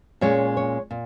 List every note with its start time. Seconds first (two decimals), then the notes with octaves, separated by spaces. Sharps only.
0.21 A#2 G#3 C#4 C#5
0.57 C#5
0.91 A#2